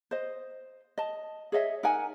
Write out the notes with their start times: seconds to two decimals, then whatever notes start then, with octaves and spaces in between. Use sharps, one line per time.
0.11 C5 D#5
0.98 D#5 A5
1.52 G#4 C#5 D#5 E5
1.83 D#4 A#4 F#5 G#5